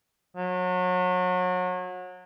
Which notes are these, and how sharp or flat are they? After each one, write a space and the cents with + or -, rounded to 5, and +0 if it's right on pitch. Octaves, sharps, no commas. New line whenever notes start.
F#3 -30